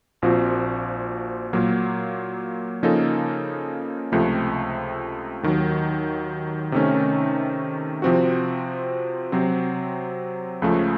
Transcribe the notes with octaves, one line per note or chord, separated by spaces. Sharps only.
A#1 A#2 F3 C4 F#4
A#2 F#3 A#3
C#3 F3 A#3 D#4 A4
C#2 C3 F3 A3
D#2 D#3 F#3
C3 D#3 A3 C#4
C3 F3 C4 F#4
C3 F#3 C4
C#2 C#3 F3 A3